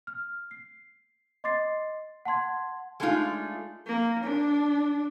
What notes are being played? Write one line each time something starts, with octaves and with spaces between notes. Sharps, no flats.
F6
C7
D#5 C6 D6 A6 C7
F#5 A5 C6 G#6
G#3 A3 D4 D#4 F4
A#3
D4